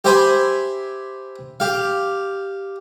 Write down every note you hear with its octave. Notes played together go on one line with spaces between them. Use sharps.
G4 C5 E5 G5 G#5 B5
G4 F5